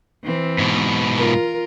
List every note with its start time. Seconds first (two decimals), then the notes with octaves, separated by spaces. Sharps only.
0.24 E3 C4
0.58 G#2 B2
1.16 F4 A#4